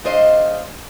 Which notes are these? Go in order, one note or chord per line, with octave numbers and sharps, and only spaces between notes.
G#3 D4 C5 D#5 F5